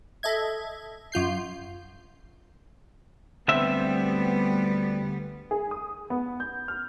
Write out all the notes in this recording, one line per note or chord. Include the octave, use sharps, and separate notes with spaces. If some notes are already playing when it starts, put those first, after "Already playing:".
A4 D#5 E5 G#6
F#2 F4 G6 C7
D2 G3 B3 C4 E5
G#4
D#6
B3
G6
F6